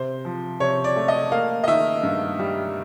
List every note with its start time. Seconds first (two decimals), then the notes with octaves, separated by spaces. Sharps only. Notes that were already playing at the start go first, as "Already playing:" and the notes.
Already playing: C3 C5
0.25 F3
0.60 C3 C#5
0.84 D5
0.96 A3
1.08 D#5
1.32 A#3 F5
1.64 D#5
1.67 D#3 E5
2.03 G2
2.39 G3